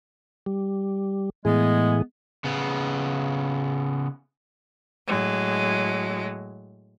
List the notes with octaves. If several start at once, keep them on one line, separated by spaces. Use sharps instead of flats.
G3
A2 E3 G#3 B3 G#4
C#3 B3
A2 F#3 G#3